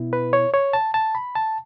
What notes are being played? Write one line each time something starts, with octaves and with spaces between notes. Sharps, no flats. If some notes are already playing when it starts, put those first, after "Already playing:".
Already playing: B2 B3 E4
B4
C#5
C#5
A5
A5
B5
A5